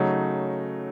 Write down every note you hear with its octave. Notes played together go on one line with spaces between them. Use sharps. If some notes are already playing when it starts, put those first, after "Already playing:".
Already playing: C#3 F#3 A3 D#4